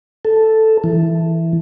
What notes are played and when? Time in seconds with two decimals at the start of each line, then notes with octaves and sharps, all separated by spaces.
0.25 A4
0.84 E3